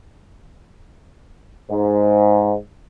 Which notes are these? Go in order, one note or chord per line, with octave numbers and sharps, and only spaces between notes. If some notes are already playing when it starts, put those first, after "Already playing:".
G#2